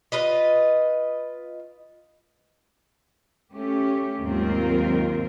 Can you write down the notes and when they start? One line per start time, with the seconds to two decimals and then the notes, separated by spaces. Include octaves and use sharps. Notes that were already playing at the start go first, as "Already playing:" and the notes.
0.12 F4 B4 D#5
3.54 A3 C#4 G4
4.21 D#2 G#2 F#3 C4 F4 A#4